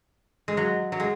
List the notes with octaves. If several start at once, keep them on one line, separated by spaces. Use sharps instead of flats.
G#3
F#3
F#3
G#3